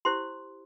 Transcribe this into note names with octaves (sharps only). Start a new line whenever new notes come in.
E4 G4 C5 C6